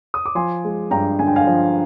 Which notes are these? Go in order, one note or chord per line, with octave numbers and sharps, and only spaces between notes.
D#6
D6
F3 G#5 C6
G#3
G2 G5 A#5
D3 G#5
G5
F5 G#5
F3